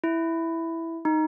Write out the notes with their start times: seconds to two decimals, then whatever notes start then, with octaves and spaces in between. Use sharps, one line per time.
0.04 E4
1.05 D#4